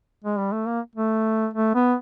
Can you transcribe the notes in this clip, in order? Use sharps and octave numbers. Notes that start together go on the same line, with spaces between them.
G#3
G3
A3
A#3
A3
A3
B3